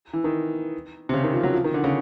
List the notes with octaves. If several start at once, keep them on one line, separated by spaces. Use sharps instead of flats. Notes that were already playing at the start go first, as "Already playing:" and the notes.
E3
D#3
C3
C#3
D#3
F3
F#3
F3
D#3
D3
C#3